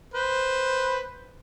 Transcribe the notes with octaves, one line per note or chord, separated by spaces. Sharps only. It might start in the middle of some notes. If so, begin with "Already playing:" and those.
B4 C5